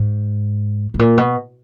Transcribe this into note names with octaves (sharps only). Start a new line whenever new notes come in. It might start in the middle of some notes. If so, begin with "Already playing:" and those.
Already playing: G#2
A2
A#2
B2